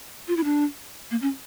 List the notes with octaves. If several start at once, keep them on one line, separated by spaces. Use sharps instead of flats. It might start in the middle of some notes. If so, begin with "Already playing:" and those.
F4
E4
D4
A#3
C#4